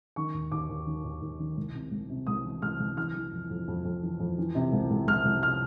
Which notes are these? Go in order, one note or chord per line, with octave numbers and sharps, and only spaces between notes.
D#3 C#6
D#2
D#2 D6
D#2
D#3
D#2
D#2
D#3
C2
C3
C2
C3
C2 D#6
E3
C2 F6
C2
E3 F6
E3
F2
F2
F2
F2
E3
F2
E3
C3
C2
C2
C2 F6
C2
C3 F6